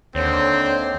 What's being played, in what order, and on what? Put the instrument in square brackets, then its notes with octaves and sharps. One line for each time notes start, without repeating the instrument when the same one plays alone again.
[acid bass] D#2 [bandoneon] D3 C5 [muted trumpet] C4 [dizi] C#5